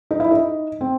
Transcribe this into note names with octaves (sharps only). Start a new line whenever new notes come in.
D#4
E4
D#4
C4